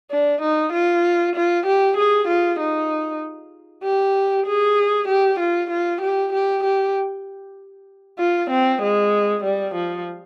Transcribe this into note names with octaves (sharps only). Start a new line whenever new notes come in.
D4
D#4
F4
F4
G4
G#4
F4
D#4
G4
G#4
G4
F4
F4
G4
G4
G4
F4
C4
G#3
G3
F3